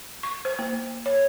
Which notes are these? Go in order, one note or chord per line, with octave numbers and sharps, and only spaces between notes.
C#6
C5
A#3
C#5